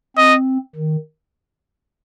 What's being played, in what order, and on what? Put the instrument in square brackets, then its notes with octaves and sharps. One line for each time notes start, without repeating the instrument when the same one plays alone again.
[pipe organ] C4 [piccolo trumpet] D#5
[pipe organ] D#3